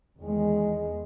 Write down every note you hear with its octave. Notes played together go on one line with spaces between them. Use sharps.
E2 D#3 G#3